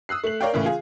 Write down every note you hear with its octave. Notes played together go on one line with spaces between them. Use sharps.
D#6 E6 F#6 C7
A3 F#7
A#4 C#5 D5 F5 G5
A2 C#3 E3 A#3
F4 G#4